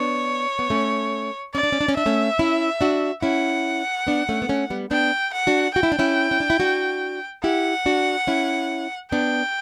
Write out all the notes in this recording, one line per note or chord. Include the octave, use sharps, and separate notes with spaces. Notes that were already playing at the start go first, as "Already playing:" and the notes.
Already playing: B3 D4 C#5
B3
A3 C#4
C#4 D5
D4
C#4
D4
C#4
D4 E5
A3 C#4
C#4 E4
D4 F#4
C#4 E4 F#5
B3 D4
A3 C#4
B3
A3 C#4
G3 B3
B3 D4 G5
F#5
D4 F#4
F#4 G5
E4
D4
C#4 E4
C#4
D4
E4
D4 F#4
E4 G4 F#5
D4 F#4
C#4 E4
B3 D4 G5